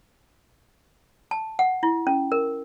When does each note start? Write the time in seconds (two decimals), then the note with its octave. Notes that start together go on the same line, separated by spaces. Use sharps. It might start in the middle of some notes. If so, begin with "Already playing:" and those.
1.31 A5
1.59 F#5
1.83 E4
2.07 C#4
2.32 A#4